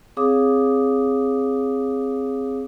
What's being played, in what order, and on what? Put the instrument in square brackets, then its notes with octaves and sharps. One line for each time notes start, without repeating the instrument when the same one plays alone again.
[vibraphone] C4 G#4 C#5 F5 D6 D#6